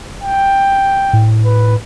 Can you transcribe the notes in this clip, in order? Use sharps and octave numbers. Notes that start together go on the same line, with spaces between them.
G5
A2
B4